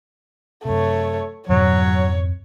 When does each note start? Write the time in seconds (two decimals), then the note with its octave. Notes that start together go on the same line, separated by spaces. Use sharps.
0.65 F#2 C3 A3 C#5
1.49 F2 G#2 B2 D3 F#3 C#5